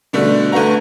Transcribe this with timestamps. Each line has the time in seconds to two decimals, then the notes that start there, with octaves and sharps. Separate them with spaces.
0.13 B2 D3 G3 A3
0.52 D2 A3 B3 F#4 A#5